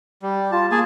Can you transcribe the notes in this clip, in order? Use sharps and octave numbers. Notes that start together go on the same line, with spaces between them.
G3
F4 A5
A#3 G#4 G#5 A5